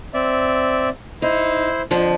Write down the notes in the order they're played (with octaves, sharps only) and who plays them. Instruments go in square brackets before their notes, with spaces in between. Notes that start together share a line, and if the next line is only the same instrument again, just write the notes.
[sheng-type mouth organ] C4 D5 E5
[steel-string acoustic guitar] D#4 [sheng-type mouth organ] E4 C5
[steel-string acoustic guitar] F2 D3 F3